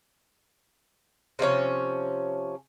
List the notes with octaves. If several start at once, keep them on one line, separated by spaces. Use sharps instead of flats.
C3 F3 A3 C#4